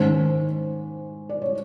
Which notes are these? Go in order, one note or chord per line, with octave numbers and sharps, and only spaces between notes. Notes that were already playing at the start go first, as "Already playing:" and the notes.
Already playing: G#2 D#3 G#3 C#4 C5
D5
C#5